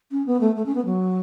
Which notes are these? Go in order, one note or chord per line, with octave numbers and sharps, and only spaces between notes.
C#4
B3
A3
A3
C#4
B3
F#3